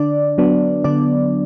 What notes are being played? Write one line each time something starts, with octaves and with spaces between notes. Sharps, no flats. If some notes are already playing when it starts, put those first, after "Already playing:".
Already playing: D3 D4 D5
F#3 B3 D4
D3 D4 D5